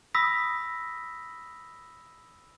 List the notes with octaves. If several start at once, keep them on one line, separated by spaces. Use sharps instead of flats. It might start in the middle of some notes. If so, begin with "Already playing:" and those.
B5 D#6 E6 A#6 B6